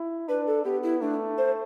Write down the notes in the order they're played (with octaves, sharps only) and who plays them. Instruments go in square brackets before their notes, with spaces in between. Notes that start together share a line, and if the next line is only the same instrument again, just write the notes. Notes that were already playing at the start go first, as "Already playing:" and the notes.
Already playing: [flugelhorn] E4
[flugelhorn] D4 [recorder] B4
[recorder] A4
[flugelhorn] B3 [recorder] G4
[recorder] E4
[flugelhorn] A3 [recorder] D4
[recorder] C5